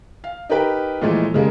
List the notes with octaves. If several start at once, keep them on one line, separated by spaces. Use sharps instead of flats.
F5
D#4 G4 A#4 B4 G5
A#2 E3 F3 G#3 A3
C#3 G3 G#3 A#3